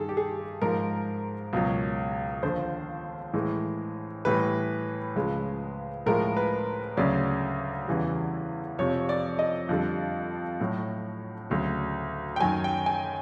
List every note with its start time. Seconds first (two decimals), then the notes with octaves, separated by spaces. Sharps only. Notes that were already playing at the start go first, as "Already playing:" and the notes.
Already playing: G2 D#3 G3 G#4 A4
0.09 G4
0.17 G#4
0.61 G#2 F3 G#3 A#4
1.53 C#2 B2 F#3
2.43 D#2 D3 F3 C5
3.34 A2 E3 G#3
4.25 A2 E3 G3 B4
5.16 C#2 C#3 F3 G#3
6.06 A2 F3 G#3 A#4
6.37 B4
6.97 D2 C#3 F#3 D5
7.87 E2 C#3 E3 G3
8.78 F2 C3 F3 C#5
9.09 D5
9.39 D#5
9.69 F2 D3 G3
10.60 A2 F#3
11.50 D2 C#3 F#3
12.36 G5
12.40 F#2 D#3 F#3 G#5
12.64 G5
12.86 G#5